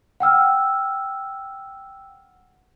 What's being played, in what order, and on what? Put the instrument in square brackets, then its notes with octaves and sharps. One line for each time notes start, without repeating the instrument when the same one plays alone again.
[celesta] F#5 G5 E6 F6